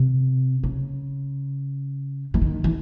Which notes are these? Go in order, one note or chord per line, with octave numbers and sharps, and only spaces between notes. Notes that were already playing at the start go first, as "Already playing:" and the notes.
Already playing: C3
C#3
E3
D#3
E3